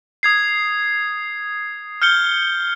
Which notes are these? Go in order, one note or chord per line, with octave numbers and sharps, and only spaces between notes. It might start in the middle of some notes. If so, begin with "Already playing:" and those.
D#6 G#6 C7
F6 G6 C#7 G7